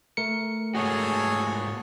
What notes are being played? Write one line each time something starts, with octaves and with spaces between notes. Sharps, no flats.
A3 A#4 C#7
G#2 A#3 F#4 G#4 A4 C#5